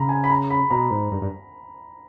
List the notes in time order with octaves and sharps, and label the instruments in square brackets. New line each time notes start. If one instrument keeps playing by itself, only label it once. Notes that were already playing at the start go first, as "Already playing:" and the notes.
Already playing: [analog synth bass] C#3 [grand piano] A#5 B5
[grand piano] G#5
B5
A#5
B5
[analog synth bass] B2 [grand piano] A#5
[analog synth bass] G#2
G2
G2